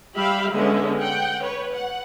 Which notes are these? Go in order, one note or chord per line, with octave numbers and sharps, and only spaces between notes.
G3 G4 E5 F5 B5
D3 G#3 B3 C#4 E5
F#5 G5
B4 C#5
F#5